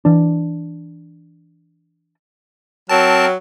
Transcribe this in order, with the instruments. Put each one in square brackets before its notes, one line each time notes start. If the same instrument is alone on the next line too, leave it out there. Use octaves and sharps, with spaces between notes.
[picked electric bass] E3 D4
[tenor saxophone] F#3 [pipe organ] C4 A#4 [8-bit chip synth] A5